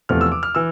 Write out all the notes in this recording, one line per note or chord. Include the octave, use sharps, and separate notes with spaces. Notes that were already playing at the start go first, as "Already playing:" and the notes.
E2 C3 F3 A3 F6
E6
D6
F6
E3 E6